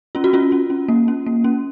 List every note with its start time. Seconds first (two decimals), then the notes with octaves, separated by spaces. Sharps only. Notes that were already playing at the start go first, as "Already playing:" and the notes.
0.15 C#4 F4
0.24 F#4
0.33 C#4 F4
0.52 C#4
0.70 C#4
0.88 A#3
1.08 C#4
1.26 A#3
1.44 C#4